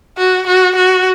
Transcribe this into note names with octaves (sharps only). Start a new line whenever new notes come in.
F#4
F#4
F#4